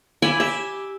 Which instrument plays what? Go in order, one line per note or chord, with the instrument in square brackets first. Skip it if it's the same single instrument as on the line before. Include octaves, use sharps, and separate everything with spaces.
[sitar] E4 [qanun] G#5 B5 D6
[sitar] G4 [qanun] E5